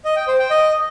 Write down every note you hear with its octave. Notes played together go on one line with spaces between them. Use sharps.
D#5
G5
C5
G5
D#5